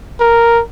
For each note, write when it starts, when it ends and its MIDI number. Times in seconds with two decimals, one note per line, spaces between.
0.20 0.62 70